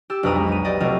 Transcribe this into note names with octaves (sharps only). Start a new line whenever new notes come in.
G4 E6 A6
B1 F2 D4 B4 A#5 D#6
G#3
F#3 D#7
G4 D5 D#5
F1 F#3 A3 C4 F4 D#5